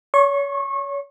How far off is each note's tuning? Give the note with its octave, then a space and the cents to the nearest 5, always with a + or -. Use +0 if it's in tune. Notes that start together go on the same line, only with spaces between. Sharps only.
C#5 +30 C#6 -30